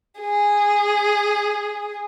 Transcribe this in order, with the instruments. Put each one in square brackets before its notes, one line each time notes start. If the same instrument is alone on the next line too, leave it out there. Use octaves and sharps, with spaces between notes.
[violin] G#4